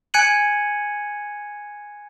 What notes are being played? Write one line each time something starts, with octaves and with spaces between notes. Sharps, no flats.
G#5 F#6 G#6 C#7 D#7 F#7